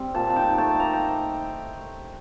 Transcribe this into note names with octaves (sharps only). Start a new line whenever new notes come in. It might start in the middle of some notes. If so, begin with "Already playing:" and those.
Already playing: G3 C4
A#2 A5
A5
D#4 G5
A3 A5
A#3 A#5
G5